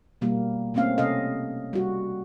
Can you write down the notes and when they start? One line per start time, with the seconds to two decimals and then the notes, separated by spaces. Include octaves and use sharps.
0.21 B2 G3 A#3
0.74 A3 A#3 C4 C#4 F5
0.98 C3 C#4 A4 D#5 F5
1.73 G3 F#4